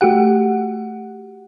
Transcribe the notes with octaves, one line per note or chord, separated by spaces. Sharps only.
A3 F#4 G4 F#5